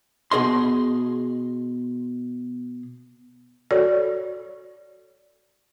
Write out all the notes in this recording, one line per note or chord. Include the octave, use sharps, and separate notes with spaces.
B2 G#4 D#5 C6
F#4 A4 C#5 D5